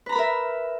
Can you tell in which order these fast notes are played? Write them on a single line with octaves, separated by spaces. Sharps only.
B4 A#5 B5 A#4 E5